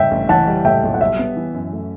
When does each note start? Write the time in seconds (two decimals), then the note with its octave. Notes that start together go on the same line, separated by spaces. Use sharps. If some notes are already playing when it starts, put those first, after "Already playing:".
Already playing: G2 E5 G5
0.11 A1
0.29 E3 F#5 A5
0.47 G3
0.65 A2 E5 G5
0.83 B1
0.94 F#5
1.01 G3 E5
1.19 B3
1.36 E3
1.54 F#2
1.73 A3